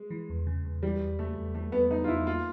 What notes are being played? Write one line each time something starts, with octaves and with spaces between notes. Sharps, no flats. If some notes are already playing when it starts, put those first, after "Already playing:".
Already playing: G#3
E3
E2
C#3
E2
E3 G3
E2
C#3 A3
E2
E3 A3
E2 B3
C#3 D#4
F4
E2 E4
A#3 F4